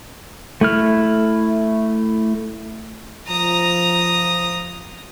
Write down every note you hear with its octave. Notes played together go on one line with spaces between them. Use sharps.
A3 E4 F6
F3 A#5 D#6